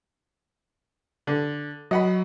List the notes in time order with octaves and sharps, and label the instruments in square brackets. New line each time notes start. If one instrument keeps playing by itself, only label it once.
[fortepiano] D3
[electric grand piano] F#3 [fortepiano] D#5 F#5 B5